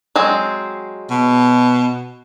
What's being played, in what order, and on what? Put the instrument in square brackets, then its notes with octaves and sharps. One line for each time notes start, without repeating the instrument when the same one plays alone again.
[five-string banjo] F#3 G#3 C4
[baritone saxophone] B2